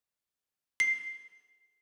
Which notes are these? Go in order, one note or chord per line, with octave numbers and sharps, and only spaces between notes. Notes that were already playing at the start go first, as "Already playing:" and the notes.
C7